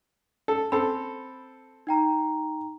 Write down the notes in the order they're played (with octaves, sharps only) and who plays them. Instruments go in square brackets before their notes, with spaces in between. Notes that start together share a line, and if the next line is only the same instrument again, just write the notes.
[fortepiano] A4
[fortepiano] C4 A4 [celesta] B5
[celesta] D#4 G5 A#5